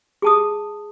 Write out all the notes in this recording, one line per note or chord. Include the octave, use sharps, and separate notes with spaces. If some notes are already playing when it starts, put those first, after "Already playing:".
G#4 A5 D#6